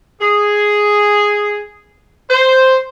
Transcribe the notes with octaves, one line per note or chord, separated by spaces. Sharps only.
G#4
C5